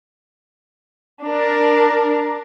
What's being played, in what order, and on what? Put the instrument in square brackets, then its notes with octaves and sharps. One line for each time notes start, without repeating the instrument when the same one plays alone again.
[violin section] D4 A#4